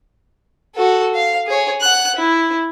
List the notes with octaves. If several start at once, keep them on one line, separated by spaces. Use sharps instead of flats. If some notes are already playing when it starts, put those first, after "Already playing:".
F#4 A4
F5
G#4 C#5
F#5 F#6
E4